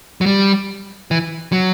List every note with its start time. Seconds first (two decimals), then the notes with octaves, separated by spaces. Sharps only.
0.21 F#3
0.26 G3
1.11 E3
1.52 F#3